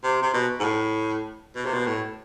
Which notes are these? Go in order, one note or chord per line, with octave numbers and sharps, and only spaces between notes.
C3
C3
B2
G#2
A2
B2
C3
B2
A2